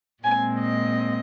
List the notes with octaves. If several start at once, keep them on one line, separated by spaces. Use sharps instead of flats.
A#2 G#3 C4 G#5
D#5